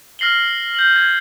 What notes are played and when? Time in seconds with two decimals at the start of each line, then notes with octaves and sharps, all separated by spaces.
0.19 F6 A#6 C7 F#7 G7
0.74 G6 F#7
0.96 G#6